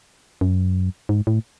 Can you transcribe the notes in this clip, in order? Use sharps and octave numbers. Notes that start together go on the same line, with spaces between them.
F#2
G#2
A2